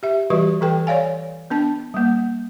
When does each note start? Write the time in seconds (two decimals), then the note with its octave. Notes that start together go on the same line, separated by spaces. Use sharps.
0.03 G4 E5
0.30 E3 G3 F#4 G4 B4 D#5
0.61 E3 A4 B4 G5
0.87 C#5 D5 F5 G#5
1.50 B3 D4 A5
1.94 G3 A#3